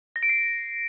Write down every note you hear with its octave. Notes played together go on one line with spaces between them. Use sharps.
A#6
D7
C7